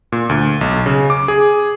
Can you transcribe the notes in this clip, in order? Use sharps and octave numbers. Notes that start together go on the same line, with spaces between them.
A#2
D2
B1
C#3
D6
G#4